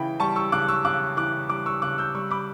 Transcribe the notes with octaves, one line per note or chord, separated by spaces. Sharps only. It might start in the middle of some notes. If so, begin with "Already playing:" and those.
Already playing: C#3 E3 G5 B5
G3 A5 C#6
C#6 E6
C#3 D6 F#6
C#6 E6
C#3 D6 F#6
E3 D6 F#6
G3 D6 F#6
C#6 E6
C#3 D6 F#6
E6 G6
G3 C#6 E6
B5 D6